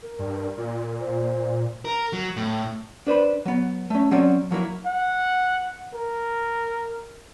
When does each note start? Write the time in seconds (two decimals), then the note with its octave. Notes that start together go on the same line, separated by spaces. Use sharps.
0.03 A#4
0.19 G2
0.58 A#2
1.00 C5
1.85 A#4
2.13 F#3
2.36 A2
3.07 D4 B4 C5 B5
3.45 F#3 B3
3.90 A3 C#4
4.11 F#3 C4 C#4 D5
4.51 F3 F#3 A#3 E4
4.86 F#5
5.95 A#4